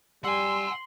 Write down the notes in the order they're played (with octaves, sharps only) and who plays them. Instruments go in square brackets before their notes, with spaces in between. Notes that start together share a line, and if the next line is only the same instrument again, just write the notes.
[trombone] G3 [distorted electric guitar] F#5 G#5 [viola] C6 [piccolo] E6